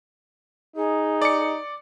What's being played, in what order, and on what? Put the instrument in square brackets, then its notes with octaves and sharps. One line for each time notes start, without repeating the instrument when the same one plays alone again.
[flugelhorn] D#4 [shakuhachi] G#4
[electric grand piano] D5 C#7